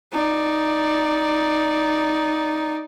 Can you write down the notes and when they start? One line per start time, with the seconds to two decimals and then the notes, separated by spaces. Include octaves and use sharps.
0.13 D#4 D5